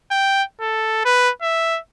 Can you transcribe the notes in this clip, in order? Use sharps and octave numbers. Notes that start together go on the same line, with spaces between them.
G5
A4
B4
E5